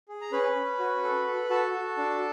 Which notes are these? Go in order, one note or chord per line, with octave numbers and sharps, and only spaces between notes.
G#4
A#5
C#4 B4 B5
C#4
F#4
A4
A4
F#4 A4 A5
F#4
D4